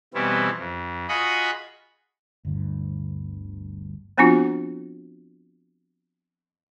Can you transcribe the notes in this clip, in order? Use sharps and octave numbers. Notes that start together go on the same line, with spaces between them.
B2 E3 G3 B3 C4 E4
F2
F4 F#4 G#4 D#5 B5 C#6
G1 D2 G2
F3 B3 C4 D4 F4 F#4